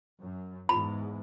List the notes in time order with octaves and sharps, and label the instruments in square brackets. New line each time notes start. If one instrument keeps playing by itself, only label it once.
[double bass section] F#2
[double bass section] E2 G#2 [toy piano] B5